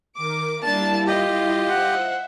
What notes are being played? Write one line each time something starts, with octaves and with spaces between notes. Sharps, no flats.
D#3 A#4 D6
G3 A#3 D4 E4 A5
F4 G4 D#5
C5 E5 F#5